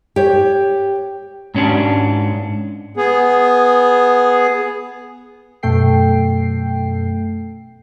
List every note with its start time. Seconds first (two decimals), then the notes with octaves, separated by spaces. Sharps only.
0.16 G4 C#5
1.55 G#2 C#4 D4
2.97 B3 G#4
5.63 F#2 B2 A3 A4 G5 C7